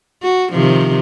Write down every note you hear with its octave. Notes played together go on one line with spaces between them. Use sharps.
F#4
C3 D#3 F3